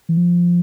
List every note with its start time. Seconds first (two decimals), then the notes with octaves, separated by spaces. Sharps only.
0.09 E3
0.17 F3